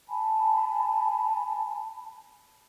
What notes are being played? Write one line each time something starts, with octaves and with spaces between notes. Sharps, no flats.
G#5 A5 B5